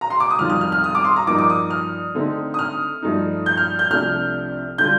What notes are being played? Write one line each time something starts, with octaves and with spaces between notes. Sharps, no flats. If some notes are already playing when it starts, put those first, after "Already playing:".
A#5
C6
D6
D#6
F2 D#3 G3 C4 F4 F6
F6
F6
F6
D#6
D6
C6
A#5
G2 F3 A#3 D#4 D6
D6
D#6
F6
D3 A3 C4 D#4
D#6
F6
G2 F3 A3 D#4
G6
F6
G6
C2 C3 F3 A3 D4 F6
D3 G3 D4 F4 G6